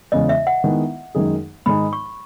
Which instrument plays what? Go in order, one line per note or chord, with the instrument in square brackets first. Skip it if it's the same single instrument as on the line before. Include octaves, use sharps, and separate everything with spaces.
[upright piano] E2 C#3 G#3 [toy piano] D#5
[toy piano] E5
F#5
[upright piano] D#3 G#3 B3 E4
F#2 D#3 G#3 D#4 G#4
[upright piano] G#2 D#3 G#3 D#4 [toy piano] B5
[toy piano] C#6